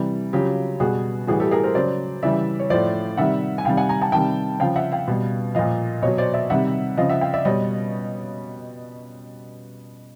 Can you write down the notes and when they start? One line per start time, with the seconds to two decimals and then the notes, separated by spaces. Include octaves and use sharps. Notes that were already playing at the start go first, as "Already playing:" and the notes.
Already playing: C3 E3 G3
0.33 C#3 F#3 F4 G4
0.80 B2 G3 F#4 G#4
1.27 A2 E3 G3 F#4 G#4
1.40 G4 A4
1.51 G#4 A#4
1.63 A#4 C5
1.75 C#3 F#3 C5 D5
2.23 C#3 E3 G3 D5 E5
2.59 C#5
2.70 A2 F3 C5 D5
3.17 C3 D#3 G3 E5 F#5
3.58 G#5
3.65 C3 D#3 G3 F5 G5
3.77 F#5 G#5
3.89 G#5 A#5
4.01 G5 A5
4.12 C3 D#3 G3 G5 A5
4.60 C#3 F3 F5 G5
4.76 E5 F#5
4.92 F5 G5
5.08 B2 G3
5.55 A#2 F3 D#5 F5
6.02 B2 F#3 C#5 D#5
6.18 C5 D5
6.34 D5 E5
6.50 C3 D#3 G3 E5 F#5
6.97 C#3 F3 D#5 F5
7.09 E5 F#5
7.21 F5 G5
7.33 D5 E5
7.45 B2 G3 C#5 D#5